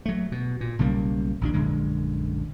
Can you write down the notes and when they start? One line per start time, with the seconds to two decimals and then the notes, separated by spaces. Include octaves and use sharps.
0.06 F#3 A3
0.32 B2
0.61 A#2
0.79 B1 C#3 G3 A#3
1.41 A#1 D#2 D4
1.54 A#1 F#2 D3 G#3